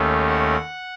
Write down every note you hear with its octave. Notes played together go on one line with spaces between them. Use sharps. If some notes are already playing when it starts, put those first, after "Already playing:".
Already playing: D#2 D#3 A3 C#4
F#5